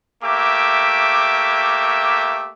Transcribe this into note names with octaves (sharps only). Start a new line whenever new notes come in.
A3 A#3 G4 E5 D6